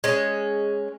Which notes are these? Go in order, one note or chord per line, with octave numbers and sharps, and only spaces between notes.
G#3 C#4